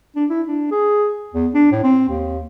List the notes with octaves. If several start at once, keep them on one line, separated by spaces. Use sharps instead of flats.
D4
E4
D4
G#4
E2
D4
A2
C4
D#2